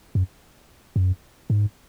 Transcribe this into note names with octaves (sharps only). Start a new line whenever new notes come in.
F#2
F#2
G#2